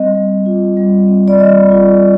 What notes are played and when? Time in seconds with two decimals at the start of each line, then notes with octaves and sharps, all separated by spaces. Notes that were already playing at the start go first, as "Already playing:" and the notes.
Already playing: G3 C4 D#5
0.15 G3
0.46 F4
0.77 G3
1.08 C4
1.28 D5
1.40 G3 D#5
1.71 F4